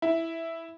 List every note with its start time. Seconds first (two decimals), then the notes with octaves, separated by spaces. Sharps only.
0.02 E4